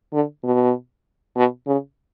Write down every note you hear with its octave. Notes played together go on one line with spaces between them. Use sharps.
D3
B2
B2
C#3